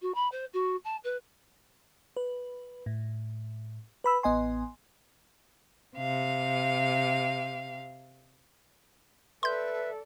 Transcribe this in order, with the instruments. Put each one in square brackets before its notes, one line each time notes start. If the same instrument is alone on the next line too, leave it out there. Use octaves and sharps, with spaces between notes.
[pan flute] F#4
B5
C5
F#4
A5
B4
[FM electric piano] B4
A2
B4 B5 E6
A1 B3 D#5 G#5 C6
[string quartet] C3 F5
[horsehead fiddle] A4 D5 [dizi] B4 [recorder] E5 [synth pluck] C6 G6